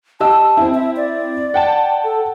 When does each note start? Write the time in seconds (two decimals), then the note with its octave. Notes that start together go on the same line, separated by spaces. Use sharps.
0.20 G4 D#5 A5 E6
0.57 C4 E4
0.75 E5
0.97 D5
1.54 F#5 G5 A5
2.04 A4